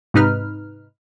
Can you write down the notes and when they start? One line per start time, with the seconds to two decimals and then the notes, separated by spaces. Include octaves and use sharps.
0.14 G#2 C3 D#4 B4 F6